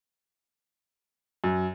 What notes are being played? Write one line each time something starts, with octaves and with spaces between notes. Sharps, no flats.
F#2